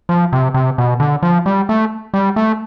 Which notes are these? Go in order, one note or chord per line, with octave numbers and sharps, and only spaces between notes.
F3
C3
C3
B2
D3
F3
G3
A3
G3
A3